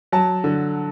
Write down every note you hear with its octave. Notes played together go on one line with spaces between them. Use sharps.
F#3 A5
D3